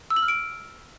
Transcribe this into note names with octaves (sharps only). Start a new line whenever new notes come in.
E6
F#7
F6
D7